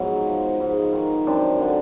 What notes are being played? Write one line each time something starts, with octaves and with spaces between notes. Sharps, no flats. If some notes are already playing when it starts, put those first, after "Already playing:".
Already playing: G#2 F3 F#3 B3
F3
G#2
D#3
F#2 C4 D4
D3